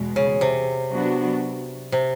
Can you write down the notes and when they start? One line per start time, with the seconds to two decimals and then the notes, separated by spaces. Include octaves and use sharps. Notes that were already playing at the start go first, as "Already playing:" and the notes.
Already playing: E2 B2 G#3
0.16 C#3
0.41 C3
0.91 F#3 B3 D4 F#4
1.92 C3